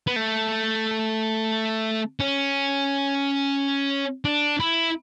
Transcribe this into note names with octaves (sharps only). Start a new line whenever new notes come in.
B3
A3
C#4
D4
E4